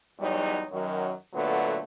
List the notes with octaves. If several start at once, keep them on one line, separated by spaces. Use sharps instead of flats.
E2 F#3 G3 D#4 C#5
F#2 D#3 F#3
A#2 D3 F#3 A3 B3